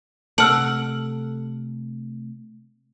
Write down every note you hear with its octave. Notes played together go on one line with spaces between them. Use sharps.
C3 A3 F#5 A5 E6 F6 D7